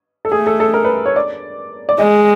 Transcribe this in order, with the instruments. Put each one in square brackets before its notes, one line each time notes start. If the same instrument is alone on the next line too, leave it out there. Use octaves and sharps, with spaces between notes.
[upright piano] A4
[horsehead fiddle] A3 [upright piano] G#4
[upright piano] A4
A4
A#4
B4
C#5
D5
D5
[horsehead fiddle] G#3 [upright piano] D#5